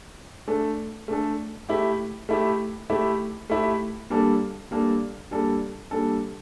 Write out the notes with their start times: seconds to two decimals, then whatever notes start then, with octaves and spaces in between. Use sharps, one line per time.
0.48 A3 D4 A4
1.08 A3 D4 A4
1.69 A3 E4 G4
2.29 A3 E4 G4
2.90 A3 E4 G4
3.50 A3 E4 G4
4.10 G3 A#3 D4 A4
4.71 G3 A#3 D4 A4
5.31 G3 A#3 D4 A4
5.91 G3 A#3 D4 A4